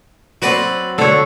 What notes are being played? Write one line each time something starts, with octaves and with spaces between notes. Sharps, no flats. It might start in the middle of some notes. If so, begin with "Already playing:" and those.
F#3 C4 F#4 B4 D5
D3 A4 C#5